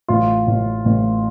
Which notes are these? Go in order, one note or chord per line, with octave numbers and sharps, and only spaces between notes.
A1 F4
A1
A1